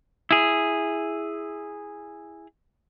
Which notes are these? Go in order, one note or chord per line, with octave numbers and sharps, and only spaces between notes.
E4 G#4